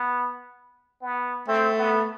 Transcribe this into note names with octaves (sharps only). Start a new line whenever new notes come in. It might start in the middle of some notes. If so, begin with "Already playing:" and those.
Already playing: B3
B3
A3 C4
B3